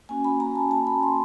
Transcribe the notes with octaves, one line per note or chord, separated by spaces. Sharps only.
A#3 C#4 F#4 G#5
B5
A#5
A5
A5
B5
C6